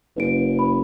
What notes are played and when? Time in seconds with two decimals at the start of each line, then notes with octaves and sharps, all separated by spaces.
0.17 F#1 B4 D7
0.59 B5